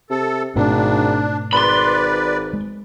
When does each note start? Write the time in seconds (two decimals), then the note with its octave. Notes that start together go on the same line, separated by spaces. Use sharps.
0.10 C3 A4
0.56 G#1 G#2 B2 A3 D4
1.53 G#1 B4 D5 B5 C6
2.53 G#3